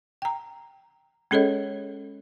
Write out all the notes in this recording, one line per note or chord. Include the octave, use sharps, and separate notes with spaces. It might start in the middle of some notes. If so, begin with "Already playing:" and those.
G5 A#5
G#3 C#4 G#4 A4 C#5 D#5